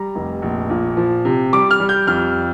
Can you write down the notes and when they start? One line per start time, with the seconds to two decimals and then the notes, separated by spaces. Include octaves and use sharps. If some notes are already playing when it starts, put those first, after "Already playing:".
Already playing: G3 A#5
0.15 F1
0.42 A#1
0.70 A#2
0.97 F3
1.25 C3
1.53 G3 D6
1.71 F6
1.80 G3
1.89 G6
2.07 F2 F6